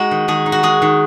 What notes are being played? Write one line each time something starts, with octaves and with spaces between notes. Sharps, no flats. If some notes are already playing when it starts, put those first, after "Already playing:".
Already playing: G#3 D#4 F#4
D#3
D#3 G#4
D#4
F#4
G#3 G#4
D#3